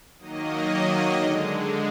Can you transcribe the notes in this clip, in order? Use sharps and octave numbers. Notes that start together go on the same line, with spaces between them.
D#3 F#3 A#3 D#5
D3 G#3